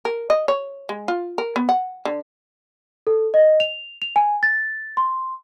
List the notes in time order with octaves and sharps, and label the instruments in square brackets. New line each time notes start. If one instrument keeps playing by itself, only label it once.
[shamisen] A#4
D#5
C#5
G#3
F4
A#4
B3
F#5
D3
[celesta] A4
D#5
F7
F7
G#5
A6
C6